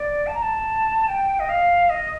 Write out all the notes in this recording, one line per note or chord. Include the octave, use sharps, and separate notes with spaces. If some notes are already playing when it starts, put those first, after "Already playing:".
Already playing: D5
A5
A#5
A5
G5
D#5
F5
D#5